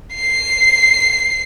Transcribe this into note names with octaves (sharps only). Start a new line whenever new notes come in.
C7